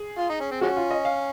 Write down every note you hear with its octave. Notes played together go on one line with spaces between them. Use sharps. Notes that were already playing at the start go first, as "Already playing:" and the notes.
Already playing: G#4
F4
D#4
C#4
C4
F3 G#3 C#4 F#4
F4
D#5
F5